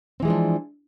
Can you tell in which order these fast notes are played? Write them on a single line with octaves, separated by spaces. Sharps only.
C4 E3 G#3 F3 D4